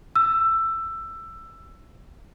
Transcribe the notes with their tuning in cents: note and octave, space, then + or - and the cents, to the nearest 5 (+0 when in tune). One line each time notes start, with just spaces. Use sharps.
E6 +15